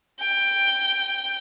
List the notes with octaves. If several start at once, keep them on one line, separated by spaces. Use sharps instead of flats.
G5